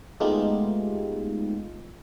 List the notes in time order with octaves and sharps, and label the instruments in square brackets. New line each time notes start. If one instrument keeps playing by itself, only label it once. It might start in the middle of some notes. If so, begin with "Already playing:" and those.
[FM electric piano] G#3 A3 B3 D#4 F4 G4